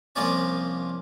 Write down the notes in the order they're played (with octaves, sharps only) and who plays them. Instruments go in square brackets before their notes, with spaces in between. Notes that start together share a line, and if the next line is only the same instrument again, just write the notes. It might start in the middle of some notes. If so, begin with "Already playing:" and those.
[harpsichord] C2 F3 A#3 C#4 D5 G#5